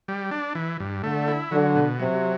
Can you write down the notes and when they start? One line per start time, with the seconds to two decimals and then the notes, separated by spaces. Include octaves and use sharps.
0.08 G3
0.31 D4
0.55 E3
0.80 G2
1.03 D3 A3
1.28 E4
1.51 D3 F#3
1.75 B2
1.99 C3 F#3